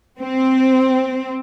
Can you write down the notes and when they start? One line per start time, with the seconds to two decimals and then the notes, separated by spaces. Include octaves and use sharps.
0.19 C4